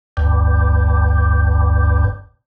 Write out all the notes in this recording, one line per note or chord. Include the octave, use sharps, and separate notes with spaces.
G1 D2 G2